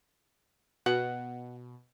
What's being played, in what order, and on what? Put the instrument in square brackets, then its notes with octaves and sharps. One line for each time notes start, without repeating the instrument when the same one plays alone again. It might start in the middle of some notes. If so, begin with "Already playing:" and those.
[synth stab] B2 [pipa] F#5